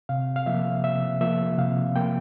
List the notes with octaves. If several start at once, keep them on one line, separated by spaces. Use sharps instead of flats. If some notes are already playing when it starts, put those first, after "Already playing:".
C3 F5
F5
F3 A#3 E5
C3 E5
F3 A#3 E5
C3 F5
F3 A#3 G5